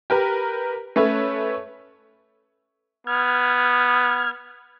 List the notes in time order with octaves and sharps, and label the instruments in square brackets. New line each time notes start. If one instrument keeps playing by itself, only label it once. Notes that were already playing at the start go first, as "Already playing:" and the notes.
[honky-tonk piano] G4 A#4 B4
A3 C#4 B4 C#5 E5
[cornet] B3 [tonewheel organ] F6 G#6